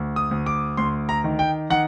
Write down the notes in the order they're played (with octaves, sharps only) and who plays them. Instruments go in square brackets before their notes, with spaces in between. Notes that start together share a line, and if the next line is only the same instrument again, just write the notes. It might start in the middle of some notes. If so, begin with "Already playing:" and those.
Already playing: [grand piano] D2
D#6
D2
D6
D2 C6
A#5
D#3
G5
D#3 F#5